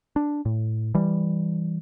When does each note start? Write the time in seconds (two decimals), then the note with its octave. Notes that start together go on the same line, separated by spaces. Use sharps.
0.16 D4
0.45 A2
0.94 E3 G3